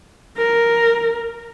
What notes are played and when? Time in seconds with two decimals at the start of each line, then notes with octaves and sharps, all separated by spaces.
0.38 A#4